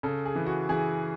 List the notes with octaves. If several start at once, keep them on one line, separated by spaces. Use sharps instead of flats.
C#3 A4
G#4
E3
F#4
E3 G#4